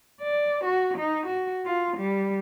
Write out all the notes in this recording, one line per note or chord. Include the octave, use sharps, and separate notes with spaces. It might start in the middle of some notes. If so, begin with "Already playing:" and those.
D5
F#4
D#4
F#4
F4
G3